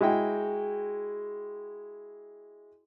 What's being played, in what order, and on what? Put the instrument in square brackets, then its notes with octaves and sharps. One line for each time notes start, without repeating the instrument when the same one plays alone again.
[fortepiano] G#3 E4 F#4 G5